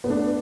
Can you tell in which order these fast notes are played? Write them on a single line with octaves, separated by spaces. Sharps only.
B3 A3 D4